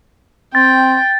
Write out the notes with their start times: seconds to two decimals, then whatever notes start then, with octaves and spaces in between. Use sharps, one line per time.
0.55 C4 G5 A6